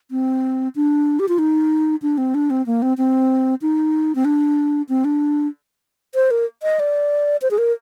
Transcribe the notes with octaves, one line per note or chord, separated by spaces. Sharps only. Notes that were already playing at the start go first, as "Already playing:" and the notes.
C4
D4
G4
F4
D#4
D4
C4
D4
C4
A#3
C4
C4
D#4
C4
D4
C4
D4
C5
A#4
D#5
D5
C5
G#4
A#4